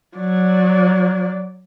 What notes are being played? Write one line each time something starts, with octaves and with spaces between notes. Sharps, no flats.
F#3 D5